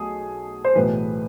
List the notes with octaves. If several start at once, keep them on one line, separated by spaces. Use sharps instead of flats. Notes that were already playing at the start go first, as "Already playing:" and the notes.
Already playing: B1 B2 A3 G#4
C5
B1 A2 E3 B4